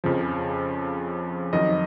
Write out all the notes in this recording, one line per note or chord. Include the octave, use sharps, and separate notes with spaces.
F2 C#3 F3
F2 D#3 F#3 D#5